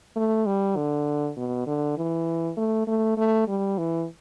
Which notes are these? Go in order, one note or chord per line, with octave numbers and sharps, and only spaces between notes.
A3
G3
D3
B2
D3
E3
A3
A3
A3
G3
E3